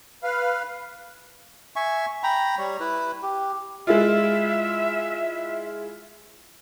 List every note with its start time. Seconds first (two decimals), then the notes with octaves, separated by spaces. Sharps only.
0.23 B4 F5
1.76 E5 G#5 C#6
2.23 G5 A#5 B5
2.58 G3 C#5
2.80 E4 B4
3.23 G4
3.87 G#3 E4 F4 E5